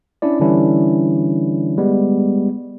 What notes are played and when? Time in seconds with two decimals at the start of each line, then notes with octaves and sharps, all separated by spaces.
0.22 C#4 D4 E4 D5
0.40 D3 E3 G3 C#4 D4 E4
1.78 G3 G#3 B3